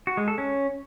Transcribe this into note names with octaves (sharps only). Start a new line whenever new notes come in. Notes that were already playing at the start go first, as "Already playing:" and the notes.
F#4
G#3
A4
C#4